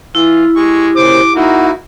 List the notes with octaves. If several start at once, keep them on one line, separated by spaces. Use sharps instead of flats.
E3 E4 F4
G#3 G4 C#6
A#2 C#3 C5 D6
A#3 D#4 E4 F#4 F#5